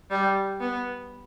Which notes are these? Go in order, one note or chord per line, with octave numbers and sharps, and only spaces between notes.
G3
B3